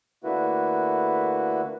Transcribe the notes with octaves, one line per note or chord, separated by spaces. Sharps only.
D3 A3 A#3 E4 F#4 B4